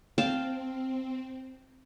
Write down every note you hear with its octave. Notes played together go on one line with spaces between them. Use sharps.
C4 F5 G5 A5